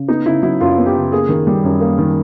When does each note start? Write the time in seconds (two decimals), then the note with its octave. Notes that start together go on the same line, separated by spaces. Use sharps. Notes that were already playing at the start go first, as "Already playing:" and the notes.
Already playing: C#3
0.08 B3 D#4
0.26 C#3 E4
0.43 F#3 E4
0.61 F#2 F4
0.78 B3
0.86 G4
0.95 C#3
1.12 A#3 G#4
1.29 D#3
1.47 G3
1.64 F#2
1.81 A#3
1.99 D#3